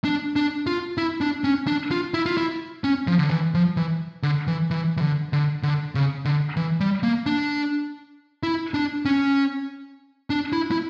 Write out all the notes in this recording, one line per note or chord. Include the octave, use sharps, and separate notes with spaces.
D4
D4
F4
E4
D4
C#4
D4
F4
E4
F4
E4
C#4
F3
D3
E3
F3
E3
D3
E3
E3
E3
D3
D3
D3
C#3
D3
E3
G3
A#3
D4
E4
D4
C#4
D4
E4
E4